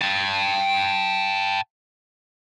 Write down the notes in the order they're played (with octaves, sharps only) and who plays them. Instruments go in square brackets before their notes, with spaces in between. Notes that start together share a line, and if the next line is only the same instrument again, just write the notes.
[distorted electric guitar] G5 A5